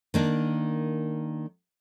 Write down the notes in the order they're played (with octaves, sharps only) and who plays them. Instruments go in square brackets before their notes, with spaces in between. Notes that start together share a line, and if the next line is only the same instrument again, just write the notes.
[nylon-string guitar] D#3 A#3 D4